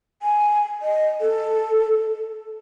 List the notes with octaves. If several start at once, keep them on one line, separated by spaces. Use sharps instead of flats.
G#5
D#5
A4